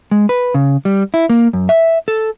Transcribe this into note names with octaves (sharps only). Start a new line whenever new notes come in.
G#3
B4
C#3
G3
E4
A#3
F#2
E5
A4